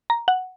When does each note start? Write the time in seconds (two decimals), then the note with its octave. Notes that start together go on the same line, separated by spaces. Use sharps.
0.10 A#5
0.28 F#5